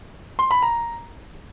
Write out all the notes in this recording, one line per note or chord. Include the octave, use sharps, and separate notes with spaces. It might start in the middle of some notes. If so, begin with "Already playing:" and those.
C6
B5
A#5